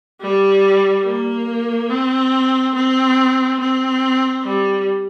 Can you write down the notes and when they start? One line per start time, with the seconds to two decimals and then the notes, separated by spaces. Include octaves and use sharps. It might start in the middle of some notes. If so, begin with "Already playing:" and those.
0.21 G3
1.05 A#3
1.90 C4
2.75 C4
3.60 C4
4.44 G3